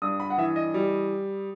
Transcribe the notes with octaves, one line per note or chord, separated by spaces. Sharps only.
G2 D#6
B5
F#5
E3 E5
D#5
G3